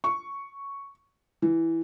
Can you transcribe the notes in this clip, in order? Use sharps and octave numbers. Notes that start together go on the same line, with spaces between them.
C#6
E3